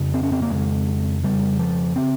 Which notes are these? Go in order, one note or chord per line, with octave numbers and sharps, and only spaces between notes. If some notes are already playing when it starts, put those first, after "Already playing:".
Already playing: F2 C#3
C4
C#4
C4
A#3
F2 C#3 G#3
F2 C#3 G3
F3
C#3 C4